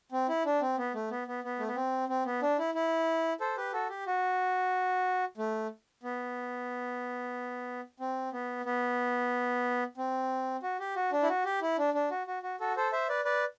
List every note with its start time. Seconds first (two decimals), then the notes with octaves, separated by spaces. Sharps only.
0.12 C4
0.28 E4
0.46 D4
0.61 C4
0.78 B3
0.94 A3
1.11 B3
1.27 B3
1.44 B3
1.59 A3
1.67 B3
1.76 C4
2.09 C4
2.26 B3
2.42 D4
2.59 E4
2.74 E4
3.40 A4 C5
3.57 G4 B4
3.73 F#4 A4
3.89 G4
4.06 F#4
5.38 A3
6.03 B3
8.00 C4
8.33 B3
8.65 B3
9.98 C4
10.62 F#4
10.80 G4
10.96 F#4
11.12 D4
11.23 E4
11.29 F#4
11.45 G4
11.62 E4
11.78 D4
11.94 D4
12.11 F#4
12.27 F#4
12.43 F#4
12.60 F#4 A4
12.76 A4 C5
12.92 C5 E5
13.09 B4 D5
13.25 B4 D5